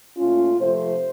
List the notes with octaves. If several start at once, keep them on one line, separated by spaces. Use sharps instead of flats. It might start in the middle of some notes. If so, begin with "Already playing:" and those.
A#2 A3 C#4 F4
C3 F3 A3 C5